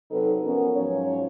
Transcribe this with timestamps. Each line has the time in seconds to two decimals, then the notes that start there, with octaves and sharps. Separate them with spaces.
0.11 C3 F#3 C4 D#4 A4 B4
0.44 F3 B3 C#4 A#4
0.76 G#2 F3 F#3 C#4 C#5